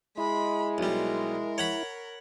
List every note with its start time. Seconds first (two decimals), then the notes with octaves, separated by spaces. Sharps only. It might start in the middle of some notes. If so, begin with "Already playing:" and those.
0.17 G#3 E4 B5
0.78 B1 G3 A#4
1.58 C#5 F#5 B5